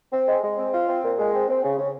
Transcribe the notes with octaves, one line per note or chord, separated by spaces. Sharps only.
C4
G#3
G#3
C4
F4
C4
A#2
G#3
C4
C4
C#3
C#3